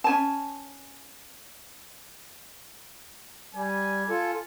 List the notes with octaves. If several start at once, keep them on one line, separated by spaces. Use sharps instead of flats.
C#4 G#5 A5
G3 G#5
F4 A4